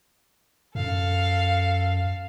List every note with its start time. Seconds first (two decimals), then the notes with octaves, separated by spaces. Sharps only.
0.75 F#2 A4 F5